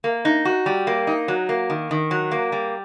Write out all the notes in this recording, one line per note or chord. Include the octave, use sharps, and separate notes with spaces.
A#3
D#4
F#4
G3
A#3
D#4
F#3
A#3
D#3
D#3
F#3
A#3
G3